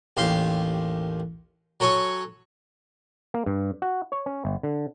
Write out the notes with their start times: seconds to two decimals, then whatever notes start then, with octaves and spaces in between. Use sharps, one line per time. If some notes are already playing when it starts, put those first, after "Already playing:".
0.17 A1 D#2 G4 F5 C6
1.80 F#3 A4 C#5 G#5 C#6
3.34 A#3
3.46 G2
3.82 F#4
4.12 C#5
4.26 C#4
4.45 G1
4.63 D3